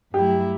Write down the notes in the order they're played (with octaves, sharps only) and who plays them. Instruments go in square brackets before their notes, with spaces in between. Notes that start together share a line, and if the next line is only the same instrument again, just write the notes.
[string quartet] G2 F#3 A3 E4 [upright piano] G4